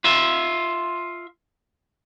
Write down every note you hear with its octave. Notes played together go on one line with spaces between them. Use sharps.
F4 E5